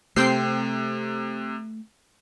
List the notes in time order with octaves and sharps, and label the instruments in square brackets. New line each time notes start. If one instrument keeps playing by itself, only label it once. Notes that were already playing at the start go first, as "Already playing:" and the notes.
[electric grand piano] C3 [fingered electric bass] A3 [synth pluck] C4 G5 C7